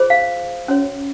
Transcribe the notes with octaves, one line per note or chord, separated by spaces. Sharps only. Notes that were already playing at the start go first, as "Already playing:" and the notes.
Already playing: F4 G#4 C5
F5
C#4 F#4 C#5